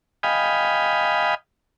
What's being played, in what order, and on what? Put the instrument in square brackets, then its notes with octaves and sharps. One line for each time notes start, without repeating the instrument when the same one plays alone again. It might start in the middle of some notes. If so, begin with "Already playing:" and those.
[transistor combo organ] D#5 F5 G5 G#5 B5